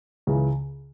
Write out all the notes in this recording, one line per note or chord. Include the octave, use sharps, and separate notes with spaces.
C#2 C#3 E3